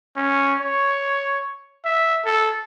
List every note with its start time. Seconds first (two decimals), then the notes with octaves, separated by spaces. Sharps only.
0.17 C#4
0.61 C#5
1.85 E5
2.26 A4